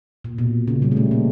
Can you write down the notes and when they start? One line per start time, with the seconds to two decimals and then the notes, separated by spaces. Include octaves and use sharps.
0.24 A#2
0.38 B2
0.68 C#3
0.82 G3
0.92 A3
0.97 G#3
1.11 A#3